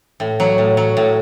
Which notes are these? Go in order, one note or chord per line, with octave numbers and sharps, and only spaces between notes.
A2
F#3
A2
F#3
A2